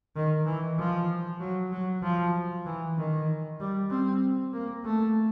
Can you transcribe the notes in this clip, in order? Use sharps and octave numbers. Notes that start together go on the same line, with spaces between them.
D#3
E3
F3
F#3
F#3
F3
E3
D#3
G3
C4
A#3
A3